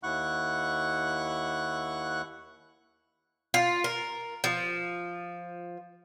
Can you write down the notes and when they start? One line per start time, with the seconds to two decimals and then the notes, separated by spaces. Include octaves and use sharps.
0.03 D#2 E4 F#5 C#6 F#6
3.54 F4
3.84 A#4
4.44 F3